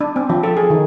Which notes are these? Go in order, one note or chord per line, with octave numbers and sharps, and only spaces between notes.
D4
C4
F3
A4
G#4
D#3